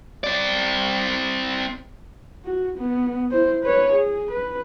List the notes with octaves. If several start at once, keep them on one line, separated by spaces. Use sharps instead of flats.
C4 D5
F#4
B3
E4 C5
B4 C#5
G#4
B4